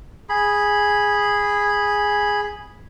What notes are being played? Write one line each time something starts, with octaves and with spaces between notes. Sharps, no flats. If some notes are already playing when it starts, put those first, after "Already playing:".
G#4 B5